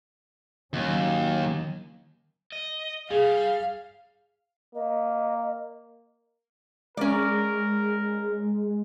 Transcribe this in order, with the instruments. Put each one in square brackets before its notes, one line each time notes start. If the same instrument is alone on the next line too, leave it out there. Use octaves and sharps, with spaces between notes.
[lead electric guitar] D#2 [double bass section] F#3 C#4
[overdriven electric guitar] D#5
[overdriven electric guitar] G3 [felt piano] G#4 [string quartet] F5
[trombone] A#3 [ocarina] D#5
[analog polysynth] G#3 [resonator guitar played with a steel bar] C#4 D5 [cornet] A#4